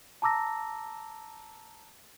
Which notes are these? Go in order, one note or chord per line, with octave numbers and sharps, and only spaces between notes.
A5 A#5 D6 E6 A#6